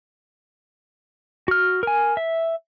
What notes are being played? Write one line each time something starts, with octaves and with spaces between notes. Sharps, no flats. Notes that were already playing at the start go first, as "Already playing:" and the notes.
F#4 F6
A#4 G#5
E5